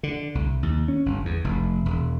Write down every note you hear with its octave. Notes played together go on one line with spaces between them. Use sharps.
D3
C2
D#2
C#4
G1
E2
F1
E1